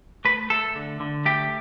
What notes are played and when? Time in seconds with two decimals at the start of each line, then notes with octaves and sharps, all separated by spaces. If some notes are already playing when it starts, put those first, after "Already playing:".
0.25 A3 B4
0.50 A3 A4
0.75 D3
1.00 D3
1.26 A3 G4